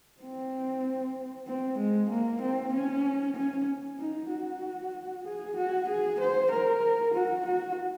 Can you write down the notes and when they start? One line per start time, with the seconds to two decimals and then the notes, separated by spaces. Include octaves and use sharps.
0.21 C4
1.47 C4
1.78 G#3
2.10 A#3
2.41 C4
2.73 C#4
3.36 C#4
3.99 D#4
4.30 F#4
5.25 G#4
5.57 F#4
5.88 G#4
6.20 C5
6.51 A#4
7.14 F#4
7.46 F#4